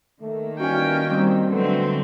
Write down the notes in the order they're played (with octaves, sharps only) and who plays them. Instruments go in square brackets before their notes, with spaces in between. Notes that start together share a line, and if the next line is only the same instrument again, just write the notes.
[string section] D#3 A#3 [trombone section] A3
[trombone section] E3 G3 [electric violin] C#4 G5 [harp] F#4 F5 G#5
[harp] G3 D#4 [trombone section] C4
[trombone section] D2 B3 [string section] D3 F#3 C4 [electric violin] A3